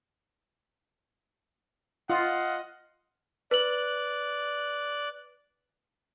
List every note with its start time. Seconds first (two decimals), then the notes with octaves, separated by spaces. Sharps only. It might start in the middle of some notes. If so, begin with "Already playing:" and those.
2.10 F4 D#5 F5 F#5
3.51 B4 D5 F#6 F#7